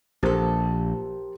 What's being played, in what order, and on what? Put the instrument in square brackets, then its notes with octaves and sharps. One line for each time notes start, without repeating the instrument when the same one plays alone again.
[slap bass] A#1 [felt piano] G4 A#4 C5 [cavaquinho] A4 A5